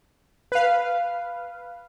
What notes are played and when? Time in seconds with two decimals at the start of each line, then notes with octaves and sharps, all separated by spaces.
0.52 B4 F5